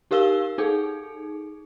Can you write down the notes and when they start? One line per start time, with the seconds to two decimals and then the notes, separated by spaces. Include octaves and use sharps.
0.11 D#4 G4 A#4 F5 E6 G7
0.58 D#4 G#4 A4